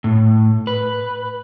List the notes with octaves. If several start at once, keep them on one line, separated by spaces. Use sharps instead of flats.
A2
B4